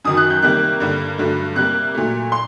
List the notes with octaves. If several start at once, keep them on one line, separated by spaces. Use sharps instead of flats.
F#2 D#3 F#3 D#6
F#6
G6
C3 D#3 G3 A#3 F#6
G2 D3 G3 A#3
G2 D3 F#3 A3
C3 G3 A#3 F#6
A#2 F#3 A3
C6